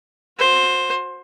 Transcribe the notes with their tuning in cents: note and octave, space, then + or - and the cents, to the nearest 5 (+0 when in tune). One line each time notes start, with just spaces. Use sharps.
F#4 -30 C5 +10